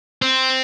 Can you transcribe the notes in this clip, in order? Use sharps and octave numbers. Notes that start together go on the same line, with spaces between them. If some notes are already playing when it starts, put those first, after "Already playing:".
C4